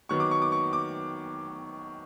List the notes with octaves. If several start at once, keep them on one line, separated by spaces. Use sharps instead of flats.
D#3 F#3 B3 C#6
D6
C#6
D6
C#6
D6